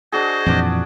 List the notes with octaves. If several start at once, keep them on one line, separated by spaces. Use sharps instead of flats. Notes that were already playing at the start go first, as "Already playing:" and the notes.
D4 F#4 G#4 C5 D#5
F2 A#2 E3 D4 D5